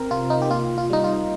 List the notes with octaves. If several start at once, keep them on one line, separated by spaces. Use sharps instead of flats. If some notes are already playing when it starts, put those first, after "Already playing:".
Already playing: C4 A#4
C3 F4
D#4
G4
A#3 F4
F4
G3 D#4
F4